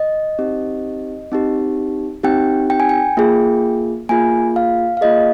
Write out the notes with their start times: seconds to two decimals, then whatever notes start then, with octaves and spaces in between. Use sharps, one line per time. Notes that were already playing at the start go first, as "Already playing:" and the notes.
Already playing: D#5
0.39 C4 D#4 G4
1.32 C4 D#4 G4
2.23 C4 D#4 G4 G5
2.70 G5
2.80 G#5
2.89 G5
3.17 A#3 F4 G#4
4.09 A#3 F4 G#4 G#5
4.56 F5
4.97 F5
5.01 A#3 F4 G#4 D#5